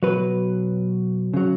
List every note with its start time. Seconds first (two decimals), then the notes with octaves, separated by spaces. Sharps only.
0.03 B2 F#3 B4
1.34 C#3 F#3